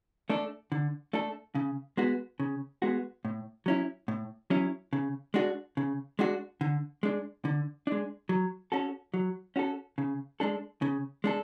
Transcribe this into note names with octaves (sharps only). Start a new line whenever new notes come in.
A3 D4 A4
D3
A3 D4 A4
C#3
G#3 B3 F#4
C#3
G#3 B3 F#4
A2
F#3 C#4 E4
A2
F#3 C#4 E4
C#3
G#3 D4 F#4
C#3
G#3 D4 F#4
D3
G#3 D4
D3
G#3 D4
F#3
C#4 F#4 A4
F#3
C#4 F#4 A4
C#3
G#3 D4 A4
C#3
G#3 D4 A4